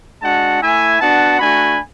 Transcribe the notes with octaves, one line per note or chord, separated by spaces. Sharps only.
G#3 D4 F#4 F#5 A5
A3 E4 E5 G#5
B3 D4 F#4 F#5 A5
A3 D4 F#4 G#5 B5